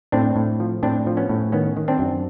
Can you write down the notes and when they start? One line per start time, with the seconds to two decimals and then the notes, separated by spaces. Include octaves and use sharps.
0.12 A2 C4 D4
0.36 A2
0.60 F3
0.83 A2 C4 D4
1.07 F3
1.17 B3 C#4
1.29 A2
1.52 D#3 B3 C#4
1.77 D#3
1.88 C4 D4
1.99 F#2